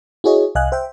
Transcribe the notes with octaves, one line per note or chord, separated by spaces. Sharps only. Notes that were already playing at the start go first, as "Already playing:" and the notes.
E4 F#4 G#4 C#5 D#5
C2 D#5 F5 G#5 F#6
C5 E5 G5